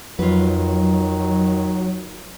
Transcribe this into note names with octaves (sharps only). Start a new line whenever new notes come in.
F2 D#3 F#3 F4 B4